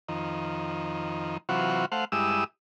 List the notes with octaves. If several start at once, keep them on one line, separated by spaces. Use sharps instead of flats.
F2 D#3
C3 E3 F#3 F4 F#4
A3 C5 F5 F#5
G2 G#3 E4 G4 D#6 E6